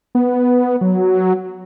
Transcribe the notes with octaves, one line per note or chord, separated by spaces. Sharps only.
B3
F#3